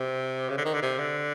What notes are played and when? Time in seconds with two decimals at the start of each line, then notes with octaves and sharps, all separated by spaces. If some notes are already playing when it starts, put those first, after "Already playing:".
Already playing: C3
0.50 C#3
0.58 D3
0.66 D#3
0.74 D3
0.82 C3
0.99 D3